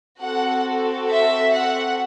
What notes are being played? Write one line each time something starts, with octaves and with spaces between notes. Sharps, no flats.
C4 F#4 A4 F#5
E5
F#5